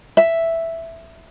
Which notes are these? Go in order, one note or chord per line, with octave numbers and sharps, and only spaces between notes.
E5